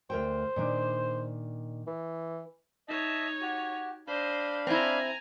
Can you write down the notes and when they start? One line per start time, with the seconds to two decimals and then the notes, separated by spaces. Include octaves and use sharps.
0.10 D2 A#4 C5 G5
0.56 A#2 D#3 D4
1.87 E3
2.89 D#4 C#5 D#5 E5 A5
3.42 F#4 G4
4.08 D4 C5 D#5 F5 B5
4.67 C4 E4 G#5 A#5